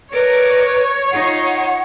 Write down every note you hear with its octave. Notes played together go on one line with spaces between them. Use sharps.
A#4 B4 C#5 D5
D#4 F4 F#5